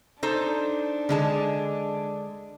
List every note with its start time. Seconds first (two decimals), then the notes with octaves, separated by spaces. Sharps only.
0.23 D4 D#4 A4 C5
1.09 D3 G#3 A5